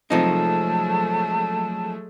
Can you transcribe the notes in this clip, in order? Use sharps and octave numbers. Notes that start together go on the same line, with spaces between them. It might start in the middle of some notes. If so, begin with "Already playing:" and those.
C3 F3 F#3 G#3 A3 D#4 A5